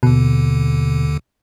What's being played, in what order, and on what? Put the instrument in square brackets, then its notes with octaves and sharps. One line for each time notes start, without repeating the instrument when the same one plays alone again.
[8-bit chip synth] D#2 D3 [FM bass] B2